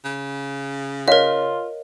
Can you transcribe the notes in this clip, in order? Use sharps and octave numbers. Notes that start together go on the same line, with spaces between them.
C#3
F4 A#4 C#5 D#5 F5